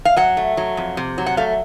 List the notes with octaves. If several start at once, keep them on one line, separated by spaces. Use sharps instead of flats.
F5
F#3 F#5
A3
F#3
F2
C3
F#3
F#5
A3 F5